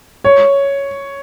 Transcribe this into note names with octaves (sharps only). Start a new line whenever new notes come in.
C#5